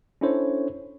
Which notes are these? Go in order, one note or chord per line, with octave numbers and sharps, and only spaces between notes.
C#4 D4 E4 A4 C5 C#5